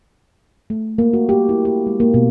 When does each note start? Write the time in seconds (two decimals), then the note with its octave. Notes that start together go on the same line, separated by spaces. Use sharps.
0.70 A3
0.98 A#3
1.13 F#4
1.29 G4
1.49 E4
1.65 G4
1.87 G#3
2.00 A#3
2.14 B2